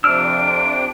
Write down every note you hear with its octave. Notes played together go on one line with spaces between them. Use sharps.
F2 C3 D4 E6 F6 D7